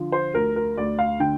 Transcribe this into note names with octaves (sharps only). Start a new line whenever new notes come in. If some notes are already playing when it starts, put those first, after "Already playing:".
Already playing: D3 F3
C5
D2 A#4
A#4
D2 D5
F5
D3 G5